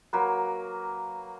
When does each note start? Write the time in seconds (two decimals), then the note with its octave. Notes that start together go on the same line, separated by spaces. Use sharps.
0.13 F#3 A#3 B4